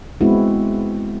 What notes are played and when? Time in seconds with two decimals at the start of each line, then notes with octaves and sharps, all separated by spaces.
0.21 G#3 B3 C4 E4 F#4